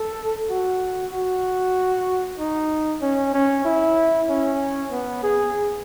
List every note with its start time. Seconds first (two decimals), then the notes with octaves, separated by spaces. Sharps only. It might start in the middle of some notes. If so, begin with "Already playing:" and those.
Already playing: A4
0.50 F#4
1.13 F#4
2.39 D#4
3.02 C#4
3.34 C#4
3.65 E4
4.29 C#4
4.91 B3
5.23 G#4